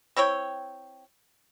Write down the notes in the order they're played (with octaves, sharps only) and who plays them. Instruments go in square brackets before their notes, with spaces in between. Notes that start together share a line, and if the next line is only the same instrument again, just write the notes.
[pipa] C4 E4 C#5 G5